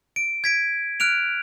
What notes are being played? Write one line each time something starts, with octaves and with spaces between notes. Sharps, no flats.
D7
G#6 B6 D7
F6 F#6 D7 F7